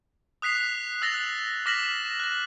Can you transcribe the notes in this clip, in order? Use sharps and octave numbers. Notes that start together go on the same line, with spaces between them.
D#6 F#6 B6 C7 F7
E6 F#6 A6 A#6 F7 G7
D6 F6 A#6 B6 E7 F#7
F#6 A#6